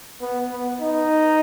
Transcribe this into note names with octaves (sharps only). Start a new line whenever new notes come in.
B3
B3
D#4